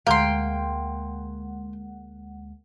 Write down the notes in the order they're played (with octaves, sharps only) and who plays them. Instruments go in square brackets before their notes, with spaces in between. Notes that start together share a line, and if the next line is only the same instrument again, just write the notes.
[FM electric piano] D2 G#3 F#5 [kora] A#3 [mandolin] G5 C6